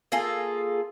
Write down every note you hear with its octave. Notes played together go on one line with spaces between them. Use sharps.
A#3 F4 G#4 A4